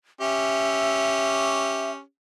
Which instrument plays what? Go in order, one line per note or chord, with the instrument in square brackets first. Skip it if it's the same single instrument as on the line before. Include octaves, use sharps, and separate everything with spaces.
[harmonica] C#4 G4 [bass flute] E5